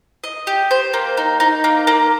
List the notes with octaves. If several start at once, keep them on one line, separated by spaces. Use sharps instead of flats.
D#5
G4
C5
A#3
D#4
D#4
A#3
A#3